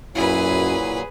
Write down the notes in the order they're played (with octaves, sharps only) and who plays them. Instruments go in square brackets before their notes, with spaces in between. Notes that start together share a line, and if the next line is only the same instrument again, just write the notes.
[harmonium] F#2 [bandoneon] A#2 F#3 [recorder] E4 [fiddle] G#4 B4